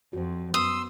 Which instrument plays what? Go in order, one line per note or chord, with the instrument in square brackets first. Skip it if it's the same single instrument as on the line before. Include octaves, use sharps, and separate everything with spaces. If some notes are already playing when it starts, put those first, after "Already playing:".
[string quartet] F2 [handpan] F#4 C5
[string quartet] F#2 [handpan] B3 [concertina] C6 E6 [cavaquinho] D#6